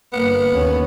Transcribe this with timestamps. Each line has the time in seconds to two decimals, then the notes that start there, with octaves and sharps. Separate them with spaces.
0.13 G1 A#3 B3
0.50 D#2 C#4